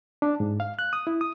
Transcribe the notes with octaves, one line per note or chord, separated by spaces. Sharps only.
D4
G#2
F5
F#6
D#6
E4
D#6